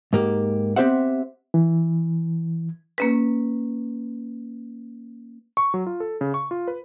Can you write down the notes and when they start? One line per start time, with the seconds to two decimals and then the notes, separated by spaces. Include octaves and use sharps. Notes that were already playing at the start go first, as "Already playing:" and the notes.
0.13 G#2 A#3 G4
0.76 B3 C4 G4 C5 E5 F#5
1.54 E3
2.98 A#3 C#4 B4
5.57 C#6
5.74 F#3
5.87 F4
6.00 A4
6.21 C#3
6.34 C#6
6.51 F4
6.68 B4